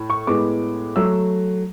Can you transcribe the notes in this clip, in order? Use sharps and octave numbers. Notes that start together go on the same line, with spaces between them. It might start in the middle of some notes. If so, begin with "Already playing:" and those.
Already playing: A2
C#6
A2 G#3 B3 D6
F#3 A3 E6